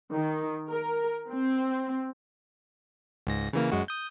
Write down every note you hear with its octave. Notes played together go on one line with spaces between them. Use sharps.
D#3
A#4
C4
C#2 G#2 A#6
C#3 E3 A#3
F#2 G#3 F#4
D#6 G6